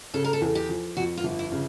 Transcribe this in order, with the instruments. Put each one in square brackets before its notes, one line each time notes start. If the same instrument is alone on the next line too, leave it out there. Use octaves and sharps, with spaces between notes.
[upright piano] C#3 [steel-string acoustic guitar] A4
[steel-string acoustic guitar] A#4
A4
[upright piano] E2
[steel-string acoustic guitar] G4
[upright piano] F3
[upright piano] F2 [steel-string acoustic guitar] F#4
[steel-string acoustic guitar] F4
[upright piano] G1
[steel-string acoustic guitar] E4
[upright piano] C#3